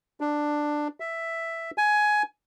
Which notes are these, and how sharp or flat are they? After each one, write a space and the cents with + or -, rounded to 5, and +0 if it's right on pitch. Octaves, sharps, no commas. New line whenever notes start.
D4 +10
E5 +5
G#5 +15